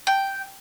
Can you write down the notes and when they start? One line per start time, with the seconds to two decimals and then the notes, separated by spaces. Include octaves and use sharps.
0.07 G5